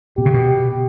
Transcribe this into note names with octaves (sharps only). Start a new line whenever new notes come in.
B2 G4
C#3
B2